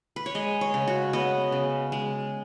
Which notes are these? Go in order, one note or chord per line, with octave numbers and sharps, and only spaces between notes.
B4
C#5
G#3 D#5
C#5
C#3
F#4
B3 D#5
C#3
G#3